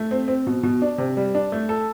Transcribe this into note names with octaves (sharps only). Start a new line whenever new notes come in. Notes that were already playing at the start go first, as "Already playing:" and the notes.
Already playing: A3
C4
C4
B2
B2
D4
C3
G3
D4
A3
A4